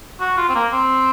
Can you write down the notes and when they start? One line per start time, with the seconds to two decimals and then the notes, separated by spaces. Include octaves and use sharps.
0.20 F#4
0.37 F4
0.49 C4
0.55 A#3
0.73 C4